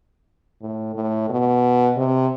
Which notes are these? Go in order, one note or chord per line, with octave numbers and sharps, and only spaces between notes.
A2
A2
B2
C3